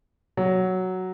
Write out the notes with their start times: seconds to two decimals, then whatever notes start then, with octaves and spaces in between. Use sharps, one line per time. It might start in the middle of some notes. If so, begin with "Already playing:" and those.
0.37 F#3